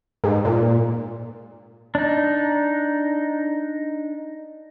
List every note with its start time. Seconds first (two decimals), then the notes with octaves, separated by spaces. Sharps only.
0.24 G#2
0.45 A#2
1.95 D4 D#4